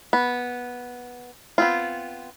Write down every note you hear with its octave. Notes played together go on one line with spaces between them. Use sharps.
B3
B3 C4 F4